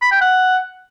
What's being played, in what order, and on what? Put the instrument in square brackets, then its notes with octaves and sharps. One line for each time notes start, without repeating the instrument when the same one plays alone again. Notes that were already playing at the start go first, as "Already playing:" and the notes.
[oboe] B5
G5
F#5